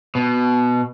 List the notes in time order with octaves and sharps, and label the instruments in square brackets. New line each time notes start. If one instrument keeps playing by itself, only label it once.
[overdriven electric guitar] B2